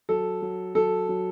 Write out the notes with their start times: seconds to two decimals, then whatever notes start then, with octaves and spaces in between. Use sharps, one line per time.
0.09 F#3 A4
0.42 F#3
0.75 F#3 A4
1.09 F#3